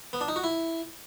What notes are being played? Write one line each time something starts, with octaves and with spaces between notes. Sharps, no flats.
B3
D4
D#4
F#4
E4